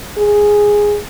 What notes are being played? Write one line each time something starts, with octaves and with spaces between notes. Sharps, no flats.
G#4